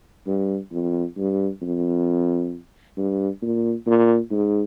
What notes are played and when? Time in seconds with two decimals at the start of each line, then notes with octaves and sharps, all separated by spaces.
0.27 G2
0.72 F2
1.17 G2
1.62 F2
2.97 G2
3.42 A#2
3.86 A#2
4.31 G#2